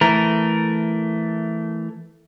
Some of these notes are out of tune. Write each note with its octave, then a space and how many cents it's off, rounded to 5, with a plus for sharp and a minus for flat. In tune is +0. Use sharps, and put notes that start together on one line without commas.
E3 +0 A3 +0 A#4 +0